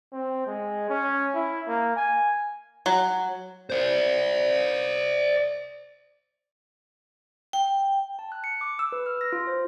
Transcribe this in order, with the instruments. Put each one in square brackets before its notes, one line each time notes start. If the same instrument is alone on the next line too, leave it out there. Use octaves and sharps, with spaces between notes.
[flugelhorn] C4
G#3
C#4
E4
A#3
G#5
[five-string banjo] F#3
[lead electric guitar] C5 D5
[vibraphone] G5
[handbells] A5
F#6
C#7
D6
E6
B4
F6
A#6
F4
C5